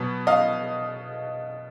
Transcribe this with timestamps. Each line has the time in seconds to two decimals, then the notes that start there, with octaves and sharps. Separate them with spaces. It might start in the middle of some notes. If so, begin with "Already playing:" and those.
Already playing: B2 F#3 B3
0.27 D#5 F5